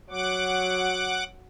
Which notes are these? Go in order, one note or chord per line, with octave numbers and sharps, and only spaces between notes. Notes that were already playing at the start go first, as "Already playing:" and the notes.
F#3 F#5 D6